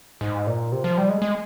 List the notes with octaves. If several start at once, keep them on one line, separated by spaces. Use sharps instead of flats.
G#2
A#2
C3
F3
G3
G#3
G#3